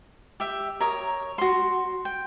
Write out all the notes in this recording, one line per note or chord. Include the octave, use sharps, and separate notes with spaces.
G4 E5
A#4 C#5 D#6
F#4 C6
G5